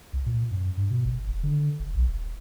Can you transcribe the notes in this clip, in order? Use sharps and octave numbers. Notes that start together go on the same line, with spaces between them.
C#2
A#2
F#2
G2
B2
G1
F1
D3
F#1
B1
D#1